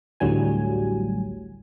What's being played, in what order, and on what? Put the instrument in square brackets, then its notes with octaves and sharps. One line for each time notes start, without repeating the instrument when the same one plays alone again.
[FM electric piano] A1 D2 A2 F#3 G3 G#5